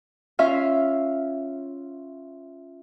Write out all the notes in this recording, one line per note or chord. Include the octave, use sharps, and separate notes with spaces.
C#4 F4 E5 F5